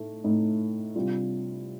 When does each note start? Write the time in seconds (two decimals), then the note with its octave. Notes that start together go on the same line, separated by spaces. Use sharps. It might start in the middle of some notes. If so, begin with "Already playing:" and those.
Already playing: A2 A3 D#4
0.24 A2 A3 D#4
0.95 C3 G3 D4 F4